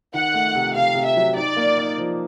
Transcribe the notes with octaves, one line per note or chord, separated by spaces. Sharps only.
D#3 F#5
A3
C3
C3 F5
C3
E5
F#3
D#4 D5
A#3
D#4
F3